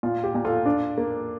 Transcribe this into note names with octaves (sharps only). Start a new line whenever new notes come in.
A#2 F4
G4
A#2
F4 A4
D4
A#3